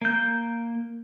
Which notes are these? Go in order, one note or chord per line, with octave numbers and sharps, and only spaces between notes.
A#3 G6